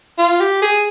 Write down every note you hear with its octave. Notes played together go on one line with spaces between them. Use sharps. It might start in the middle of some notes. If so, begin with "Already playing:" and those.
F4
G4
G#4